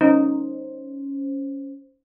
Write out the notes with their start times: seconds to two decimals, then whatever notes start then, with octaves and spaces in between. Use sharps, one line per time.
0.01 C#4 D#4 C5